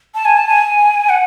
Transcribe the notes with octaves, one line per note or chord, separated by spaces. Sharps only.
A5
G#5
A5
G#5
F#5